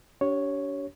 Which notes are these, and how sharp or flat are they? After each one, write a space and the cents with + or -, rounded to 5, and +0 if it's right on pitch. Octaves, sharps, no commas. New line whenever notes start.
D4 -40 G4 -30 C#5 +0